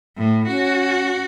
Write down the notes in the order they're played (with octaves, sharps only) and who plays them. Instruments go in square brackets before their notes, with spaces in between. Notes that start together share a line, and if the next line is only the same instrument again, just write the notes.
[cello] A2
[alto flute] C#4 [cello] F#4